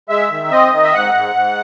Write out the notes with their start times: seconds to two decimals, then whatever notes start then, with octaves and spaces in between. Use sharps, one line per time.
0.09 G#3 E5
0.31 D#3
0.51 C4 D#5
0.72 D#3
0.83 E5
0.93 G#2 F#5
1.14 G#2
1.36 G#2